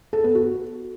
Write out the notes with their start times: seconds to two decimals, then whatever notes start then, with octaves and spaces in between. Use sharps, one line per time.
0.13 A4
0.24 B3
0.35 F#4